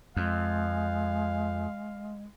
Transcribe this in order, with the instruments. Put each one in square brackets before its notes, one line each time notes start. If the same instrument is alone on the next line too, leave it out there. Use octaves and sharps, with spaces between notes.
[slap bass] F2 [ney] G#3 [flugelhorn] F5